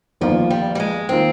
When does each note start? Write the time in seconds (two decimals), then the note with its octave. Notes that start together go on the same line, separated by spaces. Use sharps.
0.21 G1 F2 D#3 F3 A#3 F4
0.50 G3
0.75 G3
0.80 G#3
1.09 D#3 A#3 C4 F4